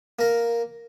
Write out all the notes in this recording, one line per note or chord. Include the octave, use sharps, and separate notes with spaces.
A#3 A#4